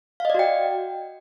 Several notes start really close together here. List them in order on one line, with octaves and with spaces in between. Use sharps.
F5 D#5 D5 F#4 G5